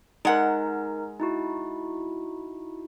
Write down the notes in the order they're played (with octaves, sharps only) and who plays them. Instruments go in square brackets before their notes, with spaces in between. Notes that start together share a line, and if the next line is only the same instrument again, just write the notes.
[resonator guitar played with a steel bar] G#3 F#5 [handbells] D#4 A#4
[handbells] D#4 E4 F#4